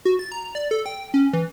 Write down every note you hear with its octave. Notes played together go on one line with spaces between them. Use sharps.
F#4
A6
A#5
D5
A4
G5
C#4
E3